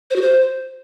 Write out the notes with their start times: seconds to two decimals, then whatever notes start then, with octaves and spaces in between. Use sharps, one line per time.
0.10 C5
0.16 F#4
0.22 C5